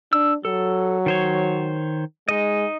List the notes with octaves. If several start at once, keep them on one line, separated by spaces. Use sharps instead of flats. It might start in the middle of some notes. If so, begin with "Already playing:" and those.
D4 E6
F#3 A4
D#3 C5 C#5
G#3 D#4 D#5